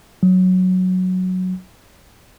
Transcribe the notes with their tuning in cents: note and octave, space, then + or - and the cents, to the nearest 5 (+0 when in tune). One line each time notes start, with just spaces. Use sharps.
F#3 -5